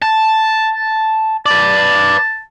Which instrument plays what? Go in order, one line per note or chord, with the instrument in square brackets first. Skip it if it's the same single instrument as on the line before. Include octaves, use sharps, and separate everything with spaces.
[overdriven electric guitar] A5
[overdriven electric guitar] B4 D5 [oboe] A5